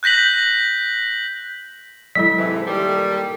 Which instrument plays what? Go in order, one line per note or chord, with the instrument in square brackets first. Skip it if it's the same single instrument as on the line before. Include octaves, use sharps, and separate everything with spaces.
[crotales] F#6 G6 A#6 B6 F#7
[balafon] F#3 G#3 E4 [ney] A4 [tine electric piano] B6
[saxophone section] G#2 C3 E3
A#2 D#3 G3